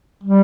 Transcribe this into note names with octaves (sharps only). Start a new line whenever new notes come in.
G3